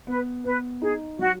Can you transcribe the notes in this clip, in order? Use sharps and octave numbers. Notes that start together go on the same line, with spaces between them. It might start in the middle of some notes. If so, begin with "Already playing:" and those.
B3 B4
B3 B4
D#4 G#4
F#3 F#4